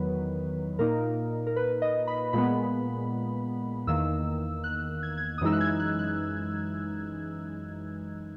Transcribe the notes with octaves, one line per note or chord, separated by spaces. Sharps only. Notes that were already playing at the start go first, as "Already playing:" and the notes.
Already playing: E2 D#3 F#3 B3 B4
A#2 A#3 D#4 A#4
A#4
B4
D#5
B5
A#2 G#3 B3 B5
E2 D#3 A#3 E6
F#6
G#6
G#6
D#6
F#2 E3 G#3 D#4 E6
F#6
G#6
F#6
F#6